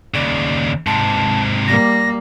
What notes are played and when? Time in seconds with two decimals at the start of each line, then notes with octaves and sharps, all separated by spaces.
0.14 D#2 C#3 D5
0.87 G#2 C3 A5
1.68 G3 A#3 A#6